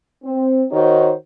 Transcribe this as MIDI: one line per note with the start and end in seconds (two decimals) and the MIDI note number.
0.23 0.63 60
0.72 1.12 51
0.72 1.12 63
0.72 1.12 66
0.72 1.12 72
0.72 1.12 73